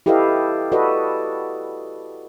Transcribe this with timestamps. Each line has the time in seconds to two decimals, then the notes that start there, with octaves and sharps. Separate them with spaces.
0.06 E4 G4 A4 B4 D#5 F5
0.72 F#4 A4 B4 D5 D#5